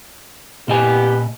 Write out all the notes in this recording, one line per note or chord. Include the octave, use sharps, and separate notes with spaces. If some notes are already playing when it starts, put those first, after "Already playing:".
A#2 B3 C4 G4 D#5 G#5